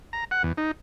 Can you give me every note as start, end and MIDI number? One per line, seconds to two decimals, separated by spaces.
0.13 0.24 82
0.31 0.43 78
0.43 0.52 40
0.57 0.71 63